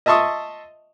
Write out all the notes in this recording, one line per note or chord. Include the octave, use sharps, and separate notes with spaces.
D#5 E5 A5 C6 C#6 D#6